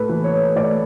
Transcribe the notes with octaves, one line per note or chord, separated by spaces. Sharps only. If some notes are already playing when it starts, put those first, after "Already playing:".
Already playing: A2 A4 B4
E3
C#5
A2 D5